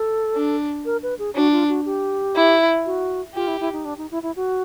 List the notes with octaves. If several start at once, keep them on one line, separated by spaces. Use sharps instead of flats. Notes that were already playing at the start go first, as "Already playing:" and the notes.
Already playing: A4
D4
A#4
B4
G#4
D4 F#4
F4
F#4
G4
E4
F#4
F4 G4
E4
E4
D#4
D4
D#4
E4
E4
F#4